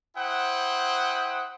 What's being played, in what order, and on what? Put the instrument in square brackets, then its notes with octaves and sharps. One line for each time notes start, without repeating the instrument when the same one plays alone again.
[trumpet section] E4 C5 F#5 G5 D#6